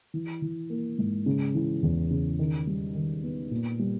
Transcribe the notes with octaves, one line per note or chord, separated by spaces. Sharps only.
E3
E3
A#3
G#2
C#3
E3
E2
C#3
D#3
G3
D#3
B3
A#2
G3